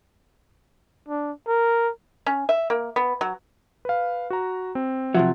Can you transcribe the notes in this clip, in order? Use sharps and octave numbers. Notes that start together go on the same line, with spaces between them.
D4
A#4
C#4
E5
A#3
B3
F#3
B4 F5
F#4 A#5
C4
C3 F3 F#3 E5 F#5